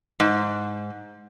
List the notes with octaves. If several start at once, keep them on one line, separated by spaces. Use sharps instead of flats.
G#2